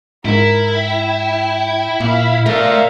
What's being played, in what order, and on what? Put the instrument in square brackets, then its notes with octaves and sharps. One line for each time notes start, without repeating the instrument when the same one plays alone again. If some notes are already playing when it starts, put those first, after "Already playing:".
[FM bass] G#2 [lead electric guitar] E4 [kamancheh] A#4
[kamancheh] G5
[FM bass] A#2 [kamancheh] F5
[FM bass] A3 [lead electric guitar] A#4 D5 [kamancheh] E5 F5